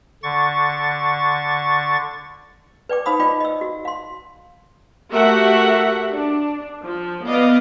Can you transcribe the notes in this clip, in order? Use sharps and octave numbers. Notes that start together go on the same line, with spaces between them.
D3 C#6 A6
B4 D5 G5 D6
D#4 C5 F5 B5 D#6 E6
F4 D5 D#5 G5 B5 D6
D#5 E6
F#4
F5 C6
A3 F#4 G4 A#4 E5 F#5
D4
F3
B3 D5 D#5 F5